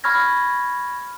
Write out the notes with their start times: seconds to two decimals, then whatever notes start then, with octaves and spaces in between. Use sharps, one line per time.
0.04 B5 C#6 F6 G#6 A#6